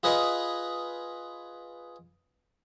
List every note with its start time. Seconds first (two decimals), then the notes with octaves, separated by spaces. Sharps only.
0.03 F4 G#4 B4 D#5